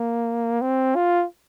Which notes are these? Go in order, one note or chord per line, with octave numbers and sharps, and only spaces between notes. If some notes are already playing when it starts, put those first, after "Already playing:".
Already playing: A#3
C4
F4